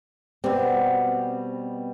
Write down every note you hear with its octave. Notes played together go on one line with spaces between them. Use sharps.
B2 G3 C4